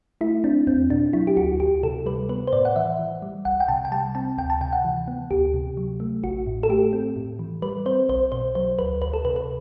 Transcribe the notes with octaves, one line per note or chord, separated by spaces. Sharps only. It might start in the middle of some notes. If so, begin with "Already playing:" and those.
A3 E4
C4 D4
E2 C4
B2 D4
F#3 E4
G4
D2 F#4
D2 G4
C3 A4
G3 B4
B3 B4
C5
A2 D5
F#5
E3 E5
E3
G3
C2 F#5
G5
C3 A5
G5
G3 A5
C4 A5
D2 G5
A5
C3 G5
F#5
E3
B3
D2 G4
C3
F#3
A3
A1 F#4
A2
A4
A3 G4
C4
A2
E3
G3 B4
C4 C5
B1 C5
B2 C5
F#3 C5
D2 B4
D2 B4
A4
C3 B4
B4